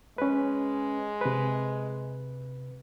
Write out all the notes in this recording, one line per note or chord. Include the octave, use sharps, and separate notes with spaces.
G#3 C#4 B4
C3 B4